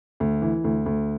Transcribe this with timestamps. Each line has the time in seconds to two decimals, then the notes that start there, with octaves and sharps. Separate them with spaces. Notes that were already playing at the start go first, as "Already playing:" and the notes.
0.20 D2
0.42 E3
0.64 D2
0.86 D2